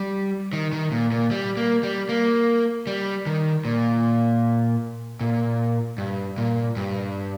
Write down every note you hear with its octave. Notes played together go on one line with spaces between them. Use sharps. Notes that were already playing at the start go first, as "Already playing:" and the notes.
Already playing: G3
D#3
D#3
A#2
A#2
G3
A#3
G3
A#3
G3
D#3
A#2
A#2
G2
A#2
G2